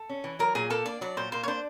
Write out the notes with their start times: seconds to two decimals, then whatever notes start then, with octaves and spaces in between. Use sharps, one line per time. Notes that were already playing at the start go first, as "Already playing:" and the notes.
Already playing: A4
0.09 C#4
0.24 E3
0.39 F#3 A#4
0.55 A#2 G#4
0.70 A#3 A4
0.85 D4 D5
1.01 F#3 D5
1.17 A#2 C5
1.32 A#3 C5
1.43 C#5
1.48 D4 C5